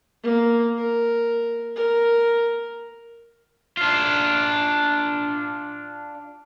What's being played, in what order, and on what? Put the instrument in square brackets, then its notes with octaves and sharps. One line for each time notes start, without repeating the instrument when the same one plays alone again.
[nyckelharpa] A#3
A#4
A#4
[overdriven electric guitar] D4 F4